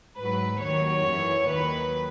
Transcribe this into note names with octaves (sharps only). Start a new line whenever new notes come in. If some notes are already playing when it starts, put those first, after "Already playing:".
G#2 F#3 B4
D#2 D#3 F#3 C#5
F#2 E3
D#2 D#3 F#3 B4